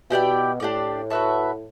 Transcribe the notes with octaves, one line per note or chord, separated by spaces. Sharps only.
B2 E4 G4 D5 G5
A2 D4 G4 D5
F#4 B4 E5 A5